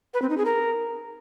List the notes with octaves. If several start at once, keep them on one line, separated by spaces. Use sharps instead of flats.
B4
C4
D#4
G#4
A#4